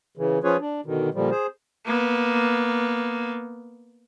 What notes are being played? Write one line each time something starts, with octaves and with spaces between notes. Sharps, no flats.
C#3 E3
F3 C#4 F4 G#4 B4 C#5
D4
B2 D3 D#3
A#2 D3 F3 G3
G#4 C5
A#3 B3